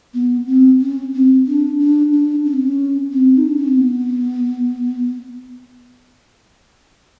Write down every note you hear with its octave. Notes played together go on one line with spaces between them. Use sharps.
B3
C4
C#4
C4
D4
D4
D4
C#4
C4
C#4
C4
D#4
D4
C#4
C4
B3